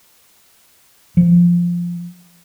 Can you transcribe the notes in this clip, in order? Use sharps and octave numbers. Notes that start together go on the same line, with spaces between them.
F3